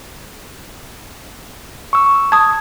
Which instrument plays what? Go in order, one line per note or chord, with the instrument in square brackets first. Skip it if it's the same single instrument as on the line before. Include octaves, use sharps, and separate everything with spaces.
[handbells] C#6 E6
[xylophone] A5 D#6 [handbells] G#6